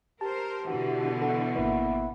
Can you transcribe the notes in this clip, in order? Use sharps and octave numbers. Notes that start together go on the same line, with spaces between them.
G4 A#4 C5 A5
B2 D3 E3 F#4
A4 F#5
G#1 A#3 B3 E4